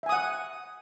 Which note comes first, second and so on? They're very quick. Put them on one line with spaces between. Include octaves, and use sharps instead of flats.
E5 G#5 D#6 F#5